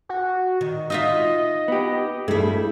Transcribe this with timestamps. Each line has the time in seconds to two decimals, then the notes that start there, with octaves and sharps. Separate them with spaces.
0.09 F#4
0.61 D#3
0.90 D#4 F4 D#5 E5
1.68 B3 G4
2.28 G2 G3 A3 E4 G#4